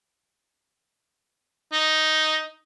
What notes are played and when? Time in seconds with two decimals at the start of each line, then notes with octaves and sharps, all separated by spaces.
1.73 D#4